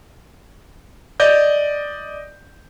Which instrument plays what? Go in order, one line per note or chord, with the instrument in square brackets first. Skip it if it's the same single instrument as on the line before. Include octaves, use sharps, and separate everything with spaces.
[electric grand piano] D5 D#5 G6